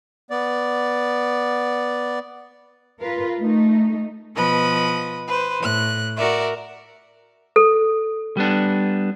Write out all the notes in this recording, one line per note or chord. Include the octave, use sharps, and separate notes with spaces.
B3 D5
F4 A#4 B4 F5
A3 D#4
B2 F3 B4 D#5 B5
B4 C5
A2 F#6
F#4 A#4 D5 E5
A4
G3 B3 D4